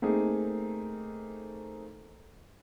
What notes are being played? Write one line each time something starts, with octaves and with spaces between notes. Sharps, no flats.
A3 A#3 C4 D#4 G#4